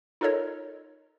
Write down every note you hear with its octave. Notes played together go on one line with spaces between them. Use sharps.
D#4 F4 A4 A#4 C#5 D#5